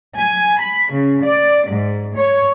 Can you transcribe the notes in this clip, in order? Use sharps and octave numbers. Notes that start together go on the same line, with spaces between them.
G#5
B5
C#3
D5
G#2
C#5